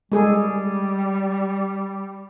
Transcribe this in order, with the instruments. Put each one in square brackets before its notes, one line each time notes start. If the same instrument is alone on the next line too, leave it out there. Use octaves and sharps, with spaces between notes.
[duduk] G3 [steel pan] G#3 G#4 A4